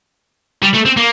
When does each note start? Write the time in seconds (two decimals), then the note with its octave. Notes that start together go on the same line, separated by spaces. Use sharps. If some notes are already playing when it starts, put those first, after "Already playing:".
0.63 G3
0.74 A3
0.86 C4
0.97 A#3